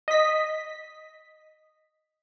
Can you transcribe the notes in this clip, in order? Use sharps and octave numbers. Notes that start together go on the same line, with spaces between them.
D#5 B6